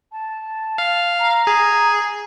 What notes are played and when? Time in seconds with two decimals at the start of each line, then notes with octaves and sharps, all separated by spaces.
0.12 A5
0.78 F5
1.19 A#5
1.47 G#4